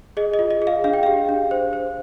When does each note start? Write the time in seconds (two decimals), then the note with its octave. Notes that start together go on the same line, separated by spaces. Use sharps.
0.17 G#4 D#5
0.34 D#5
0.39 F4
0.51 D#5
0.62 G#4
0.67 F5
0.84 D4 F5
0.93 G5
1.03 G4 F5
1.29 D4
1.51 C5
1.73 C5